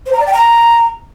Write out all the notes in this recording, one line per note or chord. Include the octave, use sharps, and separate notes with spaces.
C5
A#5
D5
G5
A#5